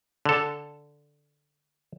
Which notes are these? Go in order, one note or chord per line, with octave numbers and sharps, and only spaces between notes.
D3 A4